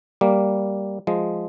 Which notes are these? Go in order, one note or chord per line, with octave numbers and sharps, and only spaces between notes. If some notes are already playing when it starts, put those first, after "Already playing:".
G3 A#3
F3 G#3